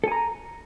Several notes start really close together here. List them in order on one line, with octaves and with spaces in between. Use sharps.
A4 G#5 A#5